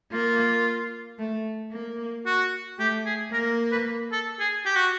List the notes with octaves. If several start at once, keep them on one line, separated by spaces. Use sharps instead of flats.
A#3 F4
A3
A#3
F#4
A3 G4
G#4
A#3 A#4
A#4
B4
A4
G#4
G4
F#4